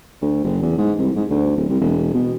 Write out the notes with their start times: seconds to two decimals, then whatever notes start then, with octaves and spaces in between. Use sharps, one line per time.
0.22 D2
0.44 F#1
0.62 E2
0.78 G#2
0.98 C2
1.16 G#2
1.30 D2
1.57 D1
1.69 C2
1.81 E1
2.14 B2